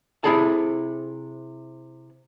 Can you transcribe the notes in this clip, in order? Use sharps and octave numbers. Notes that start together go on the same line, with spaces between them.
C3 A#3 E4 G#4 A4 A5